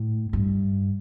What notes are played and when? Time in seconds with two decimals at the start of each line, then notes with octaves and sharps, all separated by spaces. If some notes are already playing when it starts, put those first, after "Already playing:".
Already playing: A2
0.33 G2